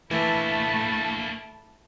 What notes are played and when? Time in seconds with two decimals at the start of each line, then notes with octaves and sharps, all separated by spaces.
0.11 E3 A3 A#3 D4 E4 A5